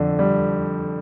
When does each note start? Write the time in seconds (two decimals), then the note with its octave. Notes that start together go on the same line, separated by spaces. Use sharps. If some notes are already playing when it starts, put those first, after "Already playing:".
Already playing: F2 D3
0.19 G3